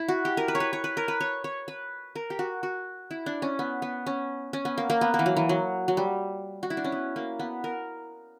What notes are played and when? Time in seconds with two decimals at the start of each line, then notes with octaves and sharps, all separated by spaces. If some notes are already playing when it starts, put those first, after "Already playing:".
Already playing: E4
0.08 F#4
0.25 G4
0.37 A#4
0.48 B4
0.55 C#5
0.60 B4
0.73 C#5
0.84 B4
0.97 A#4
1.08 B4
1.21 C#5
1.44 C#5
1.68 B4
2.16 A#4
2.30 G4
2.39 F#4
2.63 F#4
3.11 E4
3.26 D4
3.42 C#4
3.59 B3
3.82 B3
4.06 C#4
4.53 C#4
4.65 B3
4.78 A#3
4.90 A#3
5.01 B3
5.14 A#3
5.19 E3
5.26 F#3
5.37 E3
5.49 F#3
5.88 F#3
5.97 G3
6.63 F#4
6.70 E4
6.77 D4
6.84 C#4
6.92 B3
7.16 A#3
7.40 B3
7.64 A#4